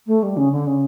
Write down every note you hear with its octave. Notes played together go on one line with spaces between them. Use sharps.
A3
G3
C#3
D3
C#3